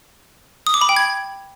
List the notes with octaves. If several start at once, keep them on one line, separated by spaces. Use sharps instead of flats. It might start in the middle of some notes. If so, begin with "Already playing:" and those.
D#6
D6
B5
G5
G#6